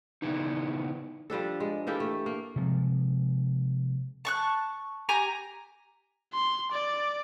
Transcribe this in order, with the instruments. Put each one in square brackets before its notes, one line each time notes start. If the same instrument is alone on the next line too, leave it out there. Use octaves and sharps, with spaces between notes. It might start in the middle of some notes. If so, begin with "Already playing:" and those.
[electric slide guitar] C#3 E3 B3 D#4
[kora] F3 G3 D4 A4
G#3
E3 A#3 G4 A4
A3
A#3
[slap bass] C3 F3 G#3
[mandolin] A5 C#6 F#6
G4 G#5 A#5
[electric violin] C6
D5